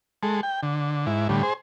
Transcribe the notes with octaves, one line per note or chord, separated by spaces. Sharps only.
G#3 A4
G5
D3
G#2 E4
A2 D3 G3
G#4 C5